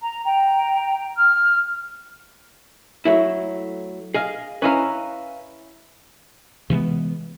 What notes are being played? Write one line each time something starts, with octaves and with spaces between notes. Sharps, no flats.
A#5
G5 A#5
F6
F#3 A3 E4
G#4 D#5 F5
C#4 E4 B4 D#5 F5 A#5
C3 E3 G#3 B3